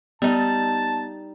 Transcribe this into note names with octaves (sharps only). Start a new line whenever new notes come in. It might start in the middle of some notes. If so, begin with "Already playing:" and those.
G3 B3 D#4 A5